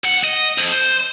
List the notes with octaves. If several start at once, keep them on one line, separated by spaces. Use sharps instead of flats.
C#2 F#5
D#5
F2
C5